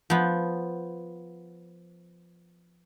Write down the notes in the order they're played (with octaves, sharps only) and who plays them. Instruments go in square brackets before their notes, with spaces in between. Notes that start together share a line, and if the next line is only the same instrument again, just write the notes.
[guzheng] F3 B3